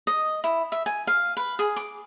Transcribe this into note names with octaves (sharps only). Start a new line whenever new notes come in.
D#5
E4
E5
G#5
F5
B4
G#4
D6